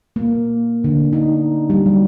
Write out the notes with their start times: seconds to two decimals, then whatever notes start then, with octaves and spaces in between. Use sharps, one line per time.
0.16 A#3
0.84 D3
1.13 D#4
1.70 G3
1.86 F#3